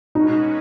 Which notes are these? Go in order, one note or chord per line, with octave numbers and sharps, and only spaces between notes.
B2 G#3 C#4 D#4 F#4 B4